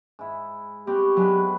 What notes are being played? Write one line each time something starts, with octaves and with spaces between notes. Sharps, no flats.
G#2 E4
G3 B3 C4 F#4 G4
G2 F#3 G#3 B4